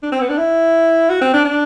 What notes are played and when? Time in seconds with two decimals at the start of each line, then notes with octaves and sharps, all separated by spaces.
0.03 D4
0.12 C4
0.21 B3
0.29 D4
0.38 E4
1.10 F#4
1.21 C4
1.33 D4
1.45 D4